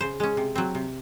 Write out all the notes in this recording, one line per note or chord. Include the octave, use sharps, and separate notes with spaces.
C#3 C5
G#3 C#4
C3
F#3 C4
C3